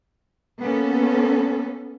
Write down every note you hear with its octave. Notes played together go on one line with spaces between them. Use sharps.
A#3 B3 C#4 A4